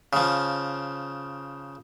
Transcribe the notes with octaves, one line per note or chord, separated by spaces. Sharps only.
C#3 F3